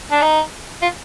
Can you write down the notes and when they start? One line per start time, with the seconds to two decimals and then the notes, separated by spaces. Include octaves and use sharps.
0.11 D4
0.22 D#4
0.82 F4